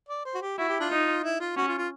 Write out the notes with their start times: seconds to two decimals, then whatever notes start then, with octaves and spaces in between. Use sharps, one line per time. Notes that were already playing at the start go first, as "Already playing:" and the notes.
0.09 D5
0.25 C5
0.35 F#4
0.41 G4
0.58 E4 F#4
0.69 G4
0.80 D4 F4
0.90 D#4
1.24 E4
1.40 F4
1.56 C#4 F#4
1.68 F4
1.78 F4